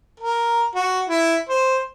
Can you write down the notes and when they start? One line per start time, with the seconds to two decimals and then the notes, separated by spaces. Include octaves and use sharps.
0.20 A#4
0.75 F#4
1.09 E4
1.50 C5